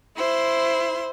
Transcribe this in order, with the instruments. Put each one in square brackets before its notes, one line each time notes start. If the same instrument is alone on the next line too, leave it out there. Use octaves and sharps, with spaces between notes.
[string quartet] E4 C5 C6